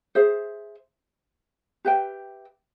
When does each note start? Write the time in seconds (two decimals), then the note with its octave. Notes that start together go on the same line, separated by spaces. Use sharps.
0.15 G#4 C5 E5
1.85 G4 B4 E5 G5